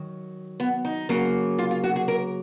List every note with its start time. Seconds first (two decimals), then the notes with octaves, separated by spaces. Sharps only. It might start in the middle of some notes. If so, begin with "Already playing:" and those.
Already playing: D#3 F#3
0.60 B3
0.85 D#4
1.09 C#3 F#3 A#3
1.59 F4
1.71 F4
1.84 F#4
1.96 G#4
2.08 A#4